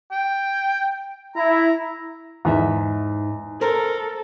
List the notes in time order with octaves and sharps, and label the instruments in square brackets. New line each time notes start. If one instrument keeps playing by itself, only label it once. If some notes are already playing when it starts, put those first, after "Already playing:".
[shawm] G5
[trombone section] E4 [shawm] A#5
[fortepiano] E2 [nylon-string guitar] G#2 D#4 E5
[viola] A4 [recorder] A#4 [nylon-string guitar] C5